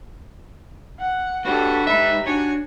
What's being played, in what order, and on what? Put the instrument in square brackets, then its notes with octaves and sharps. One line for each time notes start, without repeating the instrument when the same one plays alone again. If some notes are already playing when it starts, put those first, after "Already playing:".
[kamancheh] F#5
[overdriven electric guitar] D4 C#5 [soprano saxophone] F#4 [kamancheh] G4 A4 [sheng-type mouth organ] B4
[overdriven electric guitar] G#3 B5 [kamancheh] D#4 G4 [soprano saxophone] E5
[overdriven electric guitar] D4 [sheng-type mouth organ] F#4 G#5 [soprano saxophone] C#5